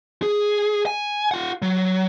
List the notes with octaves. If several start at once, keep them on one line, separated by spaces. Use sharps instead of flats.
G#4
G#5
F4 F#5
F#3